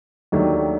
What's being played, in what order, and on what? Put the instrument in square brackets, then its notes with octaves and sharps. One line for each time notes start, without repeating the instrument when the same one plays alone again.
[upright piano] D#2 D#3 F#3 A3 D4